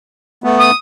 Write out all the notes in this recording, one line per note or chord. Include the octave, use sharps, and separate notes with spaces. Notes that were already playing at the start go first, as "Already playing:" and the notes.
A3 B3
D#6